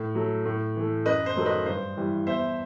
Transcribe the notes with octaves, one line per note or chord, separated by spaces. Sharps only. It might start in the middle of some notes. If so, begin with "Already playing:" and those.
Already playing: A2
F#3 A3
A2
E3 A3
F#2 B4 D#5
C5
D#3 F#3 A3
B4 D#5
G2 C5
E3 G3
E2 C5 E5